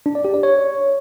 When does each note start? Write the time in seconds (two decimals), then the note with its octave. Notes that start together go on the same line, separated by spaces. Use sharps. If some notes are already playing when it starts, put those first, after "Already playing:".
0.06 D4
0.15 D5
0.25 G4
0.34 D5
0.43 C#5